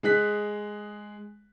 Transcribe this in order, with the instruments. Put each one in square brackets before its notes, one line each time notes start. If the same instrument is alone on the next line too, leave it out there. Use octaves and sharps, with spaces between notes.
[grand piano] G#3 G#4 F#6 B6